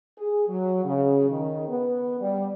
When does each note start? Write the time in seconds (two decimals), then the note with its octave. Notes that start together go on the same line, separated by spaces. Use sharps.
0.18 G#4
0.48 F#3
0.84 C#3
1.30 D#3
1.69 B3
2.20 G3